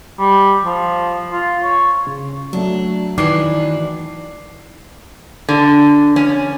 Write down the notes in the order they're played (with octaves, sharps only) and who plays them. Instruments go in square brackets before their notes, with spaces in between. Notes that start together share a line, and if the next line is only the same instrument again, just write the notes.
[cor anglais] G3
F3
F4
C#5
[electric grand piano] C#3
[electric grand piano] F#3 A3 [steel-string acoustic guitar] D4
[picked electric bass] D#3 E3 [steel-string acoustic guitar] D4 B4 [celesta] D6 C7
[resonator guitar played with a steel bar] D3
C#4